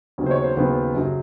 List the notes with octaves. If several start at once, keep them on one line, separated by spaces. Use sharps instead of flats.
D#2 C#3 F#3 B3
C5
C#5
C5
D#2 C#3 F#3 B3
F#2 C#3 F#3